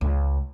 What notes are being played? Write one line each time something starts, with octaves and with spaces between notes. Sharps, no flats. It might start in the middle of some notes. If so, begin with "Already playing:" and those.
C#2